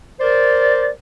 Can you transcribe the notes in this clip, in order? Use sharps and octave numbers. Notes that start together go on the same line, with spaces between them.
A#4 C5 D5